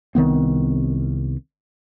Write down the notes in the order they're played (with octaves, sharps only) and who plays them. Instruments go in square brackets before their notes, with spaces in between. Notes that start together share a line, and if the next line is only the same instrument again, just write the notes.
[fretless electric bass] C2 D#3 B3 C4